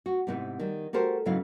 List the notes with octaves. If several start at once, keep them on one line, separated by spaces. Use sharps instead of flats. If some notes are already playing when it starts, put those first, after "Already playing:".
F#4
G#2 C3 B3 D#4 E4
D#3 G3
F#4 G4 A4 A#4 C5
G#2 C#3 F#3 B3 E4 F5